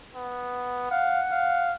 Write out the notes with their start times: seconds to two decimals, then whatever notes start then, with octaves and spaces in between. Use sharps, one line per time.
0.15 B3
0.91 F5 F#5
1.32 F5